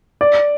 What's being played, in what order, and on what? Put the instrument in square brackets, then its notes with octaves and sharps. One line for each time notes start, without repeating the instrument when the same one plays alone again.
[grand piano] D5